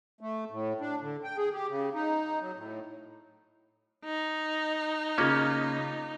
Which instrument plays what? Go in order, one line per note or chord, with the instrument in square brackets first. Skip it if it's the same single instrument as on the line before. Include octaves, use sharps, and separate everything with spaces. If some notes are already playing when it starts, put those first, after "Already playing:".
[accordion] A3
A2
D4
D3
G5
G#4
G4
C#3
D#4
F#3
A2
[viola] D#4
[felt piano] C#3 F4 [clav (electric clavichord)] A#3 C#4